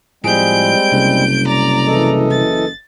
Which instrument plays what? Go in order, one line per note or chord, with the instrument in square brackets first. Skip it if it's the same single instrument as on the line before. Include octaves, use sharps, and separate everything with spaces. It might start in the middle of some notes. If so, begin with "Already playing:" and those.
[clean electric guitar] A2 F3 G#4 [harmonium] G3 G#3 C4 [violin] G6 D7
[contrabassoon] F#1 [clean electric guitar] C2
[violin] D5 A#5
[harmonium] E3 A4 D#5
[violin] A6